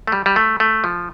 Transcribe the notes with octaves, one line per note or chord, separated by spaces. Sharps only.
A3
G3
G3
A3
A3
F3